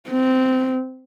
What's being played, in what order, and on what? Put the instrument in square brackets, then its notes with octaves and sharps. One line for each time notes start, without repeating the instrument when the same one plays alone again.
[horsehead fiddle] C4